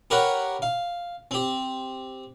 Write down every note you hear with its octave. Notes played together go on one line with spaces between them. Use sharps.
G4 A#4 B4 C#5 F#5
F5
C4 G4